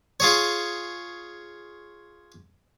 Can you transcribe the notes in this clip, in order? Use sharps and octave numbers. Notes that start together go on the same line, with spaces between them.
F4 G#4 C#5